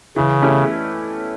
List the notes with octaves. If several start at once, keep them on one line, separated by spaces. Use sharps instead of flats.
C#3 E3
A3 C#4 E4 G4